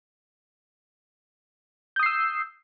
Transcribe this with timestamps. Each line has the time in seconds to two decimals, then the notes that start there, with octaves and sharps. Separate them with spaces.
1.96 G6
1.99 D#6
2.03 C7
2.06 E6